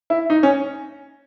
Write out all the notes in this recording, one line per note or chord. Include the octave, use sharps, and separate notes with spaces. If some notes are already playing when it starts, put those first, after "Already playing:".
E4
D#4
C#4